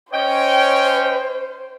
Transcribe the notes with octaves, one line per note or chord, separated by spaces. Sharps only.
C#4 C5 C#5 D#5 G5